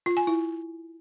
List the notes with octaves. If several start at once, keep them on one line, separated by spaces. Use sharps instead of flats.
F4
G#5
E4